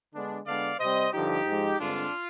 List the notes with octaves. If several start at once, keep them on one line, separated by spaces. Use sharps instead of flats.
D3 G#3 B3 D4
D3 G#3 B3 D4 D5 F5
C3 G3 C4 C5 D#5
G2 D3 F3 D#4 G4
G#2 F3 G#3
G2 D3 G#3 C4 D4 F4